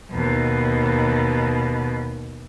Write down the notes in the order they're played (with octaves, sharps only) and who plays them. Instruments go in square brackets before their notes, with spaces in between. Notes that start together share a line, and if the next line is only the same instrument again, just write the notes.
[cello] D#2 B2